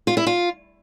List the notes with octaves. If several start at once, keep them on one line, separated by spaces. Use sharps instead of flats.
F4
E4
F4